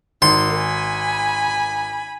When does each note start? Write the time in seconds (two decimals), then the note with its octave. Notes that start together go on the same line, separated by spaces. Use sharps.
0.22 G#1 D#3 C6
0.54 G#5 B5